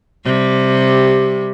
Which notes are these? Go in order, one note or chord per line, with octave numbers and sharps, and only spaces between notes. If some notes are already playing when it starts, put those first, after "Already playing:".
C3 G3